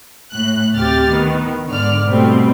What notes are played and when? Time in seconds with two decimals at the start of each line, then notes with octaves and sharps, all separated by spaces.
0.33 A2 F#6
0.76 D2 C3 G4 F6 A6
1.10 D#3 B3
1.67 G#2 D3 D5 F6
2.08 B2 G3 A3 C4